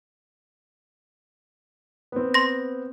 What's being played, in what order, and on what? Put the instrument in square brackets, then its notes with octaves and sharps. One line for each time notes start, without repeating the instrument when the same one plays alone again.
[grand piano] B3 C4
[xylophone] C6 A#6